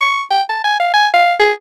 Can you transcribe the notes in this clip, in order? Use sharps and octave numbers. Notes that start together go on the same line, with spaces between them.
C#6
G5
A5
G#5
F5
G#5
F5
G#4